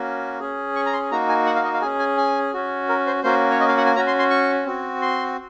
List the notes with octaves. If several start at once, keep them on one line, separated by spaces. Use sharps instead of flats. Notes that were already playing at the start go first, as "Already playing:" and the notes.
Already playing: A#3 C#4 F#4
C#4 G#4
C#6
A#5
C6
A#3 D#4 F#4 A#5
G#5
F#5
F5
D#5
F5
C#4 G#4 G#5
G#5
G#5
C#4 F#4
A#4
C5
A#3 C#4 F#4 C5
C#5
D#5
F5
F#5
G#5
C#4 F#4 A#5
C6
C6
C#6
C4 F#4
C6